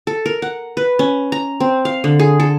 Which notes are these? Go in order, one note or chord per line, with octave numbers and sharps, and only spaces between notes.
A4
A#4
F#5
B4
C#4
A#5
C4
F5
D3
G#4
A4